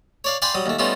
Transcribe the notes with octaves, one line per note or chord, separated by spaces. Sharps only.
C#5 D5 F5
D5 F5 G5 G#5 B5 C6
F#3 G3 D#6
D#2 A3
G3 A3 B3 C#4 D#4 F4